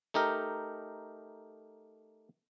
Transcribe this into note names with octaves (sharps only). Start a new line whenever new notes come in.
A3 D#4 G4 A#4